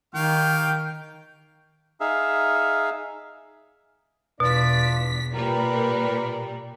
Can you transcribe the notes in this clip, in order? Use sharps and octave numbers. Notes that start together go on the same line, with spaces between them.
D#3 G4 F5 G5 C#6
D#4 G#4 E5 F5
E2 B2 D4 F4 D5 B6
A#2 G3 A#4 B4